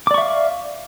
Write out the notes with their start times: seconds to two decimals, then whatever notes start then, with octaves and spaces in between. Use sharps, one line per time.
0.07 D6
0.11 D5
0.14 C#6
0.18 E5
0.22 F5